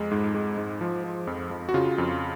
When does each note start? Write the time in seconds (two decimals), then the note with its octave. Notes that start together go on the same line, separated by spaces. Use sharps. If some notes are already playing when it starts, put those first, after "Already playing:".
Already playing: F2 G#3
0.11 G#2
0.34 G#3
0.58 G#2
0.81 F3
1.04 F3
1.27 F2
1.51 F2
1.69 F#4
1.74 C#3 F4
1.98 F2